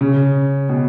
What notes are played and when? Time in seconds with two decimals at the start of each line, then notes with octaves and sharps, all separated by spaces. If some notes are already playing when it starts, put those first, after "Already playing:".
0.01 C#3
0.69 B2